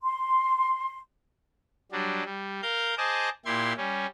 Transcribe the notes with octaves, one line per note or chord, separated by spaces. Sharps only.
C6
F#3 G3 D4
G3
A#4 F5 G6
G#4 C5 D#5 A5 D6
A#2 E4 G4 C6 G#6
G3 C#4